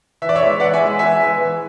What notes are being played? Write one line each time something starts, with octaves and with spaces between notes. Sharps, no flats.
E3 E5
D5
C#5 E5
G#3 B3
E3 D5 F#5
E5 G#5
G#3 B3
E3 E5 G#5
G#3 B3
E3